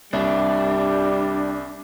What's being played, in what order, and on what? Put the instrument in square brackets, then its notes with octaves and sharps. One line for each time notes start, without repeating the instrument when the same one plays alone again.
[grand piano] C2 [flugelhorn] G3 [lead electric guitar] D4